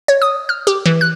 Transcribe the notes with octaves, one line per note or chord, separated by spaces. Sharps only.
C#5
D#6
F6
G4
E3
F#6